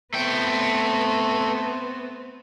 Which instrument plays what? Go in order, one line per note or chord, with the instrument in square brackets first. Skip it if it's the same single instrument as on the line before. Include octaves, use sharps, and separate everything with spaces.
[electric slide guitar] A3 G5 [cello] B3 C4